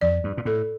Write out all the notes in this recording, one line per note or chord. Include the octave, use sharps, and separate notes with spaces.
F2 D5
G2
A#2
A2 A4